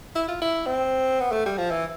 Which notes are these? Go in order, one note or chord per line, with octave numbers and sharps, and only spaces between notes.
E4
F4
E4
C4
B3
A3
G3
F3
E3